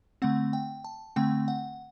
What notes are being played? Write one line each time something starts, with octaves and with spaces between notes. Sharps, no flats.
D3 A3 C4 F#5
G5
A5
D3 A3 C4 G5
F#5